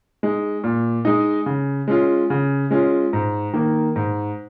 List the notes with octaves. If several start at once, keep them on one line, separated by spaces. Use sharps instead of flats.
G#3 D#4
A#2
G#3 D#4
C#3
G#3 C#4 F4
C#3
G#3 C#4 F4
G#2
D#3 A#3
G#2